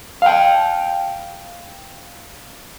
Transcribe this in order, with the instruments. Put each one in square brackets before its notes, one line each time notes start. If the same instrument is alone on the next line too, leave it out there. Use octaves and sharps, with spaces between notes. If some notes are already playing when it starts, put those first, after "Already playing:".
[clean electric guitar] F5 G5